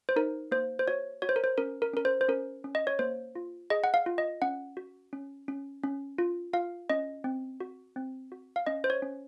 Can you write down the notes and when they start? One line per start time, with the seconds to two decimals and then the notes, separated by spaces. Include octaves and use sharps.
0.09 C5
0.16 D#4 A#4
0.52 A#3 C5
0.79 C5
0.88 F#4 C#5
1.22 F#4 C#5
1.29 C5
1.36 A#4
1.44 C5
1.58 C#4 A#4
1.82 A#4
1.94 C#4 A#4
2.05 C5
2.21 C5
2.28 C#4 A#4
2.64 C#4
2.75 D#5
2.87 C#5
2.99 A#3 C5
3.35 F4
3.70 G#4 D#5
3.84 F#5
3.94 F5
4.06 F4
4.18 D#5
4.42 C#4 F#5
4.77 F#4
5.13 C#4
5.48 C#4
5.83 C#4
6.18 F4
6.53 F4 F5
6.90 C#4 D#5
7.24 C4
7.60 F#4
7.96 C4
8.32 F#4
8.56 F5
8.67 C#4 D#5
8.84 C5
8.90 C#5
9.02 C#4